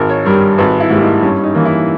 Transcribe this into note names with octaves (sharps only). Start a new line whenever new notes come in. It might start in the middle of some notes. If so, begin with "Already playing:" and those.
Already playing: G#1 A#4
C#5
G2 G3 A#4
G#1 B4
E4
G#2 G3 A#3
D#4
G2 C#4
D#4
E3 A#3
E4